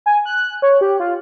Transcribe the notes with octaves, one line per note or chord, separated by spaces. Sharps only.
G#5
F#6
C#5
G4
F4